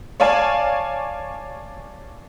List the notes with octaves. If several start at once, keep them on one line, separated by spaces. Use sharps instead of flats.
C#5 D5 F5 G#5 A5